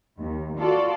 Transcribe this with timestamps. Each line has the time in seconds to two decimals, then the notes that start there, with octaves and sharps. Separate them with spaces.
0.21 D#2
0.60 F4 F#4 A4 D5